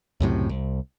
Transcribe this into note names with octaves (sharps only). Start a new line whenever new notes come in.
C#2 F#2 A2 C3
C2